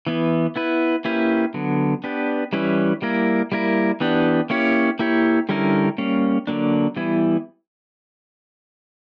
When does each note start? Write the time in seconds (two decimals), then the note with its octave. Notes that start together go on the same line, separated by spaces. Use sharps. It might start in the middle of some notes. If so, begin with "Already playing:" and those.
0.07 E3 B3 E4
0.56 B3 E4 B4
1.05 A#3 C#4 E4 G4 B4
1.54 D3 F#3 B3
2.04 B3 D4 G4 B4
2.53 E3 G3 C#4 E4 B4
3.02 G3 A#3 E4 A#4
3.52 G3 A#3 E4 A#4
4.00 E3 B3 D4 G4
4.50 A#3 C#4 E4 G4 C#5
4.99 A#3 E4 G4 C#5
5.49 D3 G3 C#4 E4 A#4
5.98 G3 A#3 C#4
6.47 D3 F#3 A#3 D4
6.96 E3 G3 B3 E4